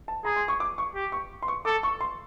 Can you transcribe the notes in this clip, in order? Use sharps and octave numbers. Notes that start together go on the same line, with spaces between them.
A5
G#4 A#5
C6
C#6
D6
C#6
G4
C#6
C6
C#6
A4 D6
C#6
C6